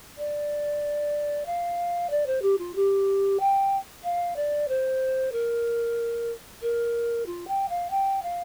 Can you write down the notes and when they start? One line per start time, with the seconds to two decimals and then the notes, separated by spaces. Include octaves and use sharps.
0.17 D5
1.45 F5
2.10 D5
2.26 C5
2.42 G4
2.58 F4
2.75 G4
3.39 G5
4.03 F5
4.36 D5
4.68 C5
5.32 A#4
6.62 A#4
7.26 F4
7.47 G5
7.69 F5
7.90 G5
8.22 F5